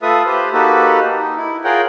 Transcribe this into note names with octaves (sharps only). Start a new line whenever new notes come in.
A3 F4 A4 B4 E5 D#6
G4 B4 C5
A#3 D#4 F#4 G4 A4 B4
D#4
E4
F4 G#4 A#4 C#5 F#5 G5